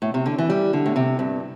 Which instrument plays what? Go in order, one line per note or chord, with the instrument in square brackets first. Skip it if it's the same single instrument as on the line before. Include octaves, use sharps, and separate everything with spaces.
[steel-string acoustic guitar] A2
C3
D3
E3
G3
D3
A2
C3
G2